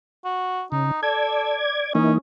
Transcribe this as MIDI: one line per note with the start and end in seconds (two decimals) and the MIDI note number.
0.25 0.63 66
0.72 0.91 49
0.72 1.03 63
1.03 1.58 69
1.03 1.93 74
1.03 1.93 92
1.95 2.18 52
1.95 2.18 58
1.95 2.14 61
1.95 2.18 63